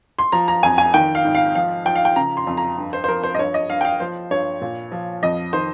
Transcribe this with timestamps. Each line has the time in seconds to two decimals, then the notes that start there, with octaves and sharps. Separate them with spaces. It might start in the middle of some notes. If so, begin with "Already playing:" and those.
0.19 C6
0.32 F3 A#5
0.48 A#5
0.63 F2 G#5
0.78 G#5
0.94 D#3 G5
1.15 F5
1.25 G#2
1.35 F5
1.55 F3 F5
1.85 F3 G5
1.95 F5
2.05 G5
2.16 C#3 A#5
2.37 C6
2.47 F2
2.57 A#5
2.78 G2
2.93 C5
3.04 C5
3.08 F3 A#4
3.23 C5
3.35 D#5
3.39 G2 C#5
3.54 D#5
3.69 G2 F5
3.81 G5
3.85 F5
4.00 F3 C5
4.31 G2 C#5
4.62 A#2
4.92 F3
5.23 F2 D#5
5.53 D#3 C5